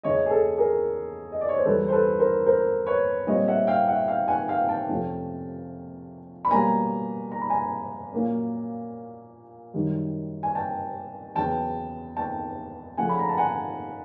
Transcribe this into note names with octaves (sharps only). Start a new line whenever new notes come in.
E2 C#3 E3 C#5 D#5
G#4
A4
G#4 A#4
D#5
D5
C#5
C5
E2 C#3 E3 G3 A4 B4
C5
A4 B4
A#4 C5
A#4 C5
B4 C#5
A#2 G3 C4 C#5 D#5
E5 F#5
F5 G5
E5 F#5
F5 G5
F#5 G#5
F5 G5
G5 A5
F2 C3 F3 A3 C#4
B5
B2 G3 A#3 C#4 G#5 A#5
A#5
B5
G#5 A#5
A#2 F#3 A#3 C#4
F#2 D#3 G3
G#5
G5 A5
E2 C#3 F#3 B3 G5 A5
G5 A5
C#3 F3 A3 C#4 F#5 G#5
B5
A#5
A5
F#5 G#5